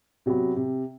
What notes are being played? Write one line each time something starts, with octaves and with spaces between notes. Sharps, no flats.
C3 F#3 B3
C3